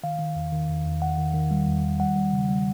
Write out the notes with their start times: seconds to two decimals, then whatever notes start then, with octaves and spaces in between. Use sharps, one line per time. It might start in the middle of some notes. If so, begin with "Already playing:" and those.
0.03 D#3 F5
0.19 D#3
0.36 E2
0.52 D#3
0.69 E2
0.85 E2
1.02 D#3 F#5
1.18 D#3
1.34 D#3
1.51 G3
1.67 E2
1.84 D#3
2.00 G3 F#5
2.16 G3
2.33 C#3
2.49 G3